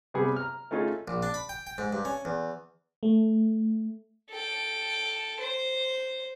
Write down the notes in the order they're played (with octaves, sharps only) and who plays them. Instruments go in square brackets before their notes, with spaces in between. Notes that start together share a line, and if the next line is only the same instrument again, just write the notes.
[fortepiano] C3 G3 B3 G#4
A#5 F6
A3 C#4 D#4 F4 G#4
[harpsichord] A#1
D4
B5
G5
G5
G#2
G2
C#4
E2
[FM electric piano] A3
[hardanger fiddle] A4 G5
C5